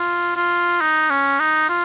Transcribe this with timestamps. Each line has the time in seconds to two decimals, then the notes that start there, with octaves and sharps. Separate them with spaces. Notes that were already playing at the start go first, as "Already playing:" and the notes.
Already playing: F4
0.36 F4
0.81 D#4
1.10 C#4
1.40 D#4
1.69 F4